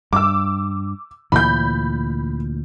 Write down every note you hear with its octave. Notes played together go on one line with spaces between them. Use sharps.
G2 D6 E6
D2 A#2 E3 B5 G6